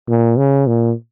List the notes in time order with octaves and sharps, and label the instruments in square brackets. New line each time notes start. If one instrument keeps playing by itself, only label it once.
[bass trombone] A#2
C#3
A#2